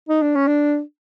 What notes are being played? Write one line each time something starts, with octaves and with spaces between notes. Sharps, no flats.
D#4
D4
C#4
D4